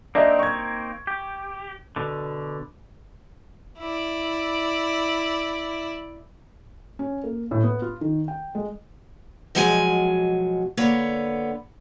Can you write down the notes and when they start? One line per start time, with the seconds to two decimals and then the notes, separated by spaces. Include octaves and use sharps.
0.15 A#3 C4 D4 D#4 D#5 E5
0.39 C#6 G#6
1.07 G4
1.96 B2 D3
3.79 E4 D5
6.99 C#4
7.24 A#3
7.51 A2
7.63 B3
7.82 F4
8.01 D#3
8.28 G5
8.55 G#3
9.55 B2 F3 F#3 G#3 B4 G#5
10.77 D3 A#3 B3 C#5